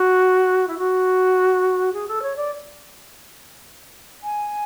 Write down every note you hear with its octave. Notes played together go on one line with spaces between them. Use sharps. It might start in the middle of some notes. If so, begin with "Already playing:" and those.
Already playing: F#4
E4
F#4
G#4
A4
C#5
D5
G#5